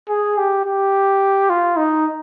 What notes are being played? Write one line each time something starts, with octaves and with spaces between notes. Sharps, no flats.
G#4
G4
G4
F4
D#4